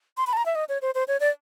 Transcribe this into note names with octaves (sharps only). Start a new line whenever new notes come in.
C6
B5
A5
A#5
E5
D#5
C#5
C5
C5
C#5
D5